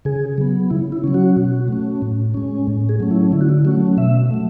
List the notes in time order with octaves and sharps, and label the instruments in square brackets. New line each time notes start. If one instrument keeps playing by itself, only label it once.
[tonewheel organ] C#3 G#4
F#3 B3
C#3 E4
E4
F#3 C#4
F#4
B2
A3 C#4
A2
G#3 C#4
A2
G#4
F#3 A3 C#4
E4
D3 E4
F#4
E4
F#3 A3 C#4 F#4
B2 E5
F#3 A3